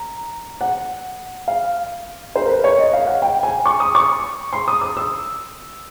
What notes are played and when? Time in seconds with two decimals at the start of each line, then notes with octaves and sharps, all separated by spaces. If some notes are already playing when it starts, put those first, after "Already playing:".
Already playing: A#5
0.61 F#5
1.48 F5
2.36 C5
2.45 A#4
2.49 B4
2.64 C#5
2.78 D#5
2.93 F5
3.07 F#5
3.22 G5
3.43 G#5
3.66 C#6
3.80 D#6
3.95 C#6
4.53 C6
4.68 D#6
4.81 D#6
4.97 E6